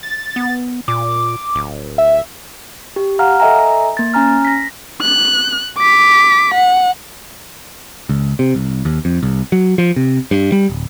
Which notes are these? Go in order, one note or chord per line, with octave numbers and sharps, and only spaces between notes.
A6
B3
A#2 D6
D1
E5
G4
F5 F#5 A#5 F6
A4 D#5 E5 G#5 A#5
A#3 A6
C#4 G#5 A#5 F6
A#6 B6
F#6
D6 B6
F#5
C#2
C3
C2
D#2
F2
C2
F#3
F3
C3
G2
G3
D1